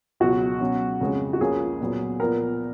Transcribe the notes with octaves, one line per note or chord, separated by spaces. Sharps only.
C#2 B2 F#3 F#4
B2 F#3 C#4
F2 C#3 G#3 C#4
F#4
C#2 C#3 F3 A#3 C#4 G#4
A#2 F#3 B3
A#2 F3 B3 A#4